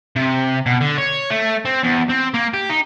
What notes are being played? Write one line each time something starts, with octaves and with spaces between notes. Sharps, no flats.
C3
B2
D3
C#5
A3
C4
E2
C4
A#3
G4
D#4